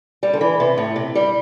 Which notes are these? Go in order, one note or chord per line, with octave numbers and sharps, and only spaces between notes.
G3
D3
E3
C3
A2
C3
G3